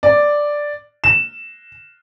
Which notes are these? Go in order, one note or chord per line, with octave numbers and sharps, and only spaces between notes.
D5
E7